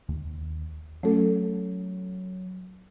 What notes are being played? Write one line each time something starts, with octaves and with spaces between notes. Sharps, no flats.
D#2
F#3 A3 C#4 A4